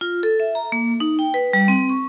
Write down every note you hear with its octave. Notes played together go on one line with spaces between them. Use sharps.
F4
A4
E5
A#5
A#3
D#4
G5
B4
G3
C4
C#6